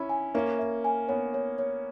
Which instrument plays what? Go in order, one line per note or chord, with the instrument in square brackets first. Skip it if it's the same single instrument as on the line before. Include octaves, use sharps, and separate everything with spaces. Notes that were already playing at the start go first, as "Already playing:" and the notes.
Already playing: [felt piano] C#4 E4 [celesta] B5
[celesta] G#5
[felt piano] A#3 C#4 [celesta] E5
[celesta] E5
G#5
[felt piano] B3 [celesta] C#5
[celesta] C#5
C#5